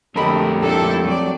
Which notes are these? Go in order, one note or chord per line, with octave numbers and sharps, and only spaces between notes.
F2 D3 A3 G4 A4 A#4 D#5 B5
A3 D4 E4 A4
F#3 C4 D5